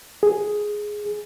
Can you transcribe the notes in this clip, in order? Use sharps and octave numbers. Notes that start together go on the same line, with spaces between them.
G#4